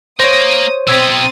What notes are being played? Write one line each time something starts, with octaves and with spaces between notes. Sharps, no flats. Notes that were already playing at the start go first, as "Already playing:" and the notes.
A#3 C5 C#5 D#6 A#6
B2 C4 D#4 D#6 E6 G#6 A6 B6